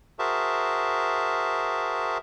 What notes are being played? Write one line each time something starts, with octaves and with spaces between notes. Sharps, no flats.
F#4 G#4 A#4 C5 E5 A5